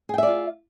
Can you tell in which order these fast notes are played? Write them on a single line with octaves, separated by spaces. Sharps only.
G#4 G5 E5 D5 F4